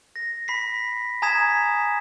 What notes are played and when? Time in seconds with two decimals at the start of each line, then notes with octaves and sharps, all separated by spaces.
0.16 A#6
0.48 B5 B6 C7
1.22 G#5 A#5 D#6 G#6 B6 E7